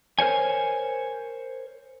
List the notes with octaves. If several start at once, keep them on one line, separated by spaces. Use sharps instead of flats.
A#4 C5 C#5 G#5